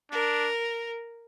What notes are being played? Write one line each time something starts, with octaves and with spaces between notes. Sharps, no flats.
D4 A#4